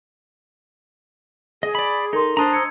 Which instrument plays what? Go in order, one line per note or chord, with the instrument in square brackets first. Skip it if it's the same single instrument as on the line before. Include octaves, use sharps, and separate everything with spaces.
[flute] G#4 [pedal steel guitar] D#5
[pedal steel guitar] D5 B5
[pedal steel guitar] D#4 [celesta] A4 A#4 C6
[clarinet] D4 [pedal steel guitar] C5 D#5 A#5
[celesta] E6 C#7 [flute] G#6